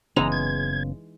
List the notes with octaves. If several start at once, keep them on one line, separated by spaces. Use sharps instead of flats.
F#1 C#3 E3 G#3 B3 D#4 A#5
G#6